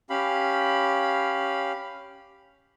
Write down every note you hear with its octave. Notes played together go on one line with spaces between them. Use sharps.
C#4 G4 F5 B5